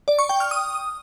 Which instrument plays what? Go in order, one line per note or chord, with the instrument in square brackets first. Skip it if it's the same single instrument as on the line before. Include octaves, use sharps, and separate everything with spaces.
[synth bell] D5
C#6
G5
F6
D#6